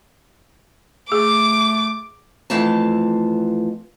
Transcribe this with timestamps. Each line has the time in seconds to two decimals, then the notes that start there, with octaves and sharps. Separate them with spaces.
1.12 A3 G#4 D6
2.50 F2 E3 A3 F4 F5 A5